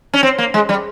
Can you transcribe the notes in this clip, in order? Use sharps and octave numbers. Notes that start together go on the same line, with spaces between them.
C#4
C4
A#3
G#3
G3